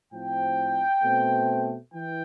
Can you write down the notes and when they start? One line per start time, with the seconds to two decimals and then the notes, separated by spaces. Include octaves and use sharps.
0.12 A2 F3 C4 G5
1.03 B2 A3 C4
1.93 E3 G5